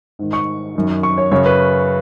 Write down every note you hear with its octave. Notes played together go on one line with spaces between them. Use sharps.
G#2 D#3
C#6
F#2 D#3
C#6
C#5
F#2 C#3 C#5
B4